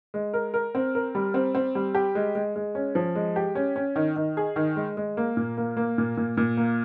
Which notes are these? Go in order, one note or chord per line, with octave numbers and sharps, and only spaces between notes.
G#3
A#4
A#4
C4
A#4
G3
C4
C4
G3
G4
G#3
G#3
G#3
C#4
F3
G#3
G4
C#4
C#4
D#3
D#3
G#4
D#3
G#3
G#3
A#3
A#2
A#3
A#3
A#2
A#2
A#2
A#3